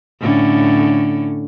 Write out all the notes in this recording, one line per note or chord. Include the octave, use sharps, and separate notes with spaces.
A2 D3 C#4